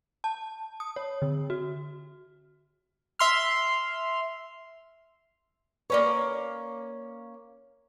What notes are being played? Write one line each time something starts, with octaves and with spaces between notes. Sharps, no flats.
A5
D#6
C#5
D3
F#4
E5 C6 F6
A#3 C#4 B4 C#5 D5